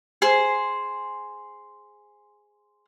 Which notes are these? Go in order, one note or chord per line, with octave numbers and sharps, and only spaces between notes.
G#4 C5 C6